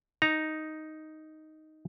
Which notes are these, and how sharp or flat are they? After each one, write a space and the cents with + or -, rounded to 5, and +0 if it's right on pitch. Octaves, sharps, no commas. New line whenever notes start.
D#4 +0 A#5 +0